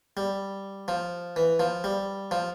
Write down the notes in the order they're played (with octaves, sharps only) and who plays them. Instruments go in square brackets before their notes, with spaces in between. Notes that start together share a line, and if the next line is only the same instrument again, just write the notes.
[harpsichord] G3
F3
E3
F3
G3
F3